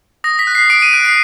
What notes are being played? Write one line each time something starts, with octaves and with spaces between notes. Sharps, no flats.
D#6 A#6
B6
F#6
C7
D#6 D7
D#7
F#6 D7
C7